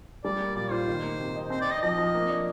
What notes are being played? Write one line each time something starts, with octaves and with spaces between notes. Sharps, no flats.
G3 D5
A#3
A#2 D5
F4 C5
D#3
A#3
C3
D#4
C4 C5
D5
D#4
D#5
F3 D#5
F3
A#3
D4